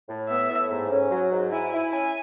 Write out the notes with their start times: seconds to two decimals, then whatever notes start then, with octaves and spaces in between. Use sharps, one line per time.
0.09 A2
0.29 B3 E5
0.50 A2
0.69 G#2
0.91 C#4
1.11 F#3
1.31 G#2
1.52 E4 G#5
1.72 E4
1.92 C#4 G#5